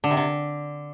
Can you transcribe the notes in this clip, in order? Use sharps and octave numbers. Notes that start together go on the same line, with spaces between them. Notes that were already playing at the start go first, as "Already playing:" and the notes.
D3
C3
D3